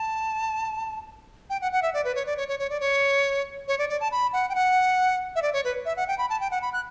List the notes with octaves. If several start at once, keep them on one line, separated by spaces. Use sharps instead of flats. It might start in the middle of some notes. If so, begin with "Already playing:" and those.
Already playing: A5
G5
F#5
F#5
E5
D5
B4
C#5
D5
C#5
C#5
C#5
D5
C#5
C#5
D5
D5
A5
B5
F#5
G5
F#5
E5
D5
C#5
B4
E5
F#5
G5
B5
A5
G5
F#5
B5
F#6